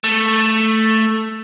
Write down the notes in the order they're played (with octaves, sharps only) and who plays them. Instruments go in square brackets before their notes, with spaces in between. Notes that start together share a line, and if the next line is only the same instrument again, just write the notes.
[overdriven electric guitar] A3